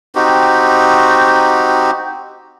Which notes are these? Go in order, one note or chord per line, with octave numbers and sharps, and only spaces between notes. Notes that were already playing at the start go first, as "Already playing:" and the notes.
C4 D#4 F#4 G4